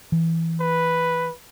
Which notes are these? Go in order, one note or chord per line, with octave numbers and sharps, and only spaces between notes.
E3
B4